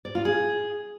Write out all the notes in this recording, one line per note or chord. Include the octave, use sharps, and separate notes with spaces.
D5
F4
G#4